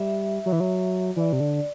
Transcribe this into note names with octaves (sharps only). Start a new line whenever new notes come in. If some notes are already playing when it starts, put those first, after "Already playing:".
Already playing: G3 E5
F#3
E3
F#3
E3 D5
C3
D3